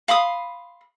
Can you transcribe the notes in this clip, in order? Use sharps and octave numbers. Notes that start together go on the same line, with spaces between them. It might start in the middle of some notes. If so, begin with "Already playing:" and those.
F5 B5 C6 D#6